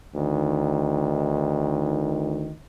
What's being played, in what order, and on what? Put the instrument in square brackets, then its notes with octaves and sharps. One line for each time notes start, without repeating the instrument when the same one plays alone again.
[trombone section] D2 D#3